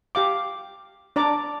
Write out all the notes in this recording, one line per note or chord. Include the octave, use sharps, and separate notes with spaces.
G4 F5 D6
D4 D5 A#5 D6